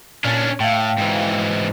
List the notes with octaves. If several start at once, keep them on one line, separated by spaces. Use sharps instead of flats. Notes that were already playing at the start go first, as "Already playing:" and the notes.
A#2 C#4 D4
A2 F5 G5
G#2 E3